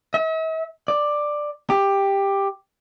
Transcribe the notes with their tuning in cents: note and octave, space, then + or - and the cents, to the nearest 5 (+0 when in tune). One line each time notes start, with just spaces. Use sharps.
E5 -45
D5 +10
G4 +10